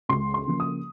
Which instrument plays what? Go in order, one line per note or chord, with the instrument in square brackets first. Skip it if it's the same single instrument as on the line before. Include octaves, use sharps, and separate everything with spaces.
[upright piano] C#2 C6
C6
C#3 F3 A#3
D#6